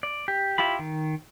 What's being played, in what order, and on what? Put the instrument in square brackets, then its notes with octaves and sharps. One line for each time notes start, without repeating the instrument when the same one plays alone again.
[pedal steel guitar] D5
G4
E4 F4 G4 B5
D#3